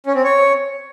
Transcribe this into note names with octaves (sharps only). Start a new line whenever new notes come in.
C#4
C4
C#5